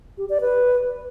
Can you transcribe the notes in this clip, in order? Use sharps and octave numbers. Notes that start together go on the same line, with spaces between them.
G4
D5
B4